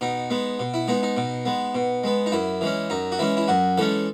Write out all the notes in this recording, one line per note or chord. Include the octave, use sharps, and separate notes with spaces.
B2 D#4
G#3 B3
B2
E4
G#3 B3 D#4
D#4
B2
G#3 B3
B2
G#3 B3
D#4
F#2 E4
E3 G#3 C#4
F#2 D#4
F#4
E3 G#3 C#4 E4
E4
F#2 F#4
E3 G#3 C#4 A4